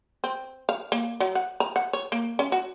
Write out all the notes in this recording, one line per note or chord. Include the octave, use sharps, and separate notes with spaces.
C4
F5
A#3
F#3
F#5
A#5
F#5
C#5
A#3
C#4
F#4